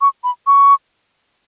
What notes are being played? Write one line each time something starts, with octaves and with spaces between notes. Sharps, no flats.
C#6
B5
C#6